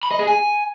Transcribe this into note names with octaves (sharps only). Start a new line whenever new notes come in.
B5
D#5
G#4
G#5